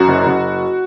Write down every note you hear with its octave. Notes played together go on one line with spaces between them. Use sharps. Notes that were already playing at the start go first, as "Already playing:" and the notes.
Already playing: F#2 F#4
F#1
F#1